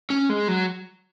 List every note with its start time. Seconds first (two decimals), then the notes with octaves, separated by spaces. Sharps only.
0.10 C#4
0.29 G#3
0.48 F#3